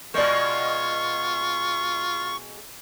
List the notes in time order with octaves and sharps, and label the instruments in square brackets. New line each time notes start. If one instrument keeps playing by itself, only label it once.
[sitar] B2 G#3 [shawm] F4 [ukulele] C5 D5 [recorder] C#6